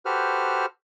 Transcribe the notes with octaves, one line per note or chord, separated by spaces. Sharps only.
F#4 G4 A4 B4 C5 F6